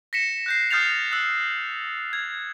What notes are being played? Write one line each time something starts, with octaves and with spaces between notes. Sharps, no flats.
A#6 B6 C#7 E7
F#6 G6 C7
D#6 F6 G6 A6 C7 F7
E6 F#6
G#6